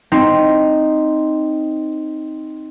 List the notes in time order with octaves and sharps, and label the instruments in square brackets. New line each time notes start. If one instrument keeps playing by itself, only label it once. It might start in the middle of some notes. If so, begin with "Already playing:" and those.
[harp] C4 D#4